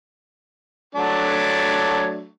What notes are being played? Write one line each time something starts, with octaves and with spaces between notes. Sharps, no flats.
F#3 A3 D4